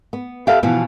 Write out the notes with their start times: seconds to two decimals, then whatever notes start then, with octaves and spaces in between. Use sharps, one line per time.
0.13 B3
0.47 G4 A4 B4 E5 F5
0.63 B2 E3 F3 B3